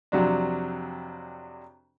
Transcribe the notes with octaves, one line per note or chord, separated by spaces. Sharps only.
F2 C3 F#3 D4